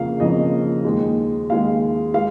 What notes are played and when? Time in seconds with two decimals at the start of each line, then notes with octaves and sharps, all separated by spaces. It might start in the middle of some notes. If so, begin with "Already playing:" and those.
Already playing: F2 C#3 F3 A#3 F5
0.20 F2 C#3 F3 A#3 D#5
0.85 D#2 D#3 G#3
1.50 D#2 D#3 G#3 F5
2.14 G#3 F5